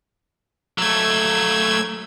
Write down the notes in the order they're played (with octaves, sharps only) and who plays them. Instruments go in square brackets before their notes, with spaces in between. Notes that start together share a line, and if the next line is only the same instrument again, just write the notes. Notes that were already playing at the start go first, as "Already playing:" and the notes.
[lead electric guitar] F#3 A3 [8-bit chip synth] E6 G#6